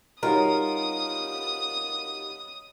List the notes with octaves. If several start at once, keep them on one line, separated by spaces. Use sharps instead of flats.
G3 D#4 F4 F#4 A#4 C#5 D#5 D#6